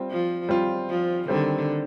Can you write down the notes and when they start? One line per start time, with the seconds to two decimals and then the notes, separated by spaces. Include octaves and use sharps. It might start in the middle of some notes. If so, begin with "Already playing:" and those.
Already playing: G3 C4 F4
0.10 F3
0.49 G3 C4 F4
0.89 F3
1.28 D3 D#3 G3 C4